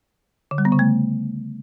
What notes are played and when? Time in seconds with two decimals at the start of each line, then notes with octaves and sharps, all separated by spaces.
0.51 D3
0.58 G3
0.65 B3
0.72 C#3
0.79 A3